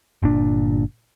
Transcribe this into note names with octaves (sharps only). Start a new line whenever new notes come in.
G1 A#2 D4